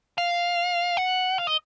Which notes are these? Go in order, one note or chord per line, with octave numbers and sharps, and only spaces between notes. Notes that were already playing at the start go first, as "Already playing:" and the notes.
F5
F#5
F5
D#5